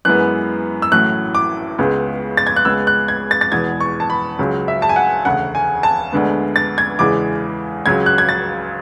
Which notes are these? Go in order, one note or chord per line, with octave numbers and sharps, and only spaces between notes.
F#2 E3 G#3 B3 F#6
E6
A1 A2 F#3 A3 F#6
D6
C#2 C#3 G#3 B3
A6
G#6
F#6
C#2 C#3 G#3 B3 E6
F#6
G#6
A6
A6
E2 B2 G#3 B3 G#6
C#6
A5
B5
C#2 C#3 F#3
E5
A5
G#5
F#5
E1 D2 C#3 F#5
G#5
A5
D2 D3 G#3 B3
A6
G#6
E2 C#3 E3 G#3 D6
C#2 C#3 F#3 G#6
F#6
G#6
A6